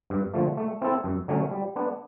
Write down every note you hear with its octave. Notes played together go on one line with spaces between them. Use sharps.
G2
D3 F3 A3
A3
C4 E4 A4
F#2
D3 F#3 A3 C#4
G3
B3 D4